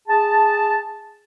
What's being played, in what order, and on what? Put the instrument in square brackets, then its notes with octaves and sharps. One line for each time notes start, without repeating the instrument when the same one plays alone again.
[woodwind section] G#4 A5